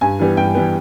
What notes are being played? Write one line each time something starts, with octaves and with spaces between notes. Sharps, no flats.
G2 G#5
E3 G3 B3
G2 G5
E3 G3 B3